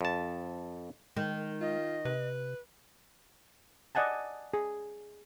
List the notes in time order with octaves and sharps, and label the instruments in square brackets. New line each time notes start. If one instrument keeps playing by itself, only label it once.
[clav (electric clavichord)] F2 A5
[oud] D#3 [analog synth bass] G#3
[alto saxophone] F4 [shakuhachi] D#5
[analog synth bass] C3 [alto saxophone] B4
[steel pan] D5 D#5 F#5 G#5 A5
G#4